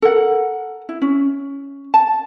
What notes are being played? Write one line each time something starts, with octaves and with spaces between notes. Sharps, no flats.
A4 A#4 F#5
E4
C#4
A5